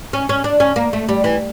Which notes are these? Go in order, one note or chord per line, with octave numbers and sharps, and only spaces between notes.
C#4
C#4
D4
C#4
A#3
A3
G3
E3